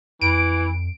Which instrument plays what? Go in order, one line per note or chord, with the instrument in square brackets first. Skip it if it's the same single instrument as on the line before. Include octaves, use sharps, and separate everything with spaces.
[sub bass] F2 [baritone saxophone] E3 [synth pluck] D7